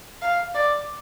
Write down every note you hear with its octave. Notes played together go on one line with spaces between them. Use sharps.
F5
D5